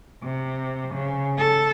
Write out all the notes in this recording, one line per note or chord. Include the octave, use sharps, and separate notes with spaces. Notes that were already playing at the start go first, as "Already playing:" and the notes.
C3
C#3
A4